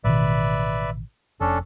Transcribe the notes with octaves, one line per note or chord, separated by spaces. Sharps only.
A1 B2 D#3 B4 D5 E5
F1 C#4 D4 A4